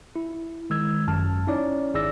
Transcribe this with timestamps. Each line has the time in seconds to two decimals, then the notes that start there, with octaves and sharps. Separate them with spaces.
0.16 E4
0.70 D#3 G#3 E6 G#6
1.07 G#1 F#2 A5 F6
1.47 C#4 D#4 E4 C#5 D5
1.94 G#1 E4 G#4 D5 E6 A#6